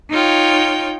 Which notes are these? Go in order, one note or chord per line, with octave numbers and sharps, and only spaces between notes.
D#4 F4 C#5 G5